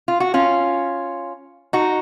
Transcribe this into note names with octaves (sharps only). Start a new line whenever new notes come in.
F4
F#4
C#4 F4
D#4 F#4